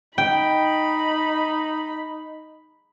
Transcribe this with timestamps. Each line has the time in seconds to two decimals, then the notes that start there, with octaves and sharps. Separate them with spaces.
0.18 D#4 G5 B5